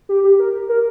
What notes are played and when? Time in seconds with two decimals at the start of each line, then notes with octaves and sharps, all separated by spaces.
0.09 G4
0.24 G4
0.39 A#4
0.69 A#4